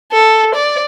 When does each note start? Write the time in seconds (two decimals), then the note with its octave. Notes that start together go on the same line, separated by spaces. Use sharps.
0.12 A4
0.55 D5